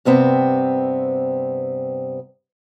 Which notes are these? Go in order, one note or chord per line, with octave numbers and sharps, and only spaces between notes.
G2 C3 B3 C4